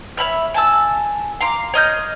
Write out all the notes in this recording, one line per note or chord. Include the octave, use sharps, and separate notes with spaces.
C#5 E5 B5 F6
G#5 A5 E6
F5 A#5 C6 D6
C#5 D#5 F6 G6